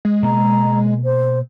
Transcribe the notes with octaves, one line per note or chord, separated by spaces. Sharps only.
G#3
B2 A#3 A#5
C5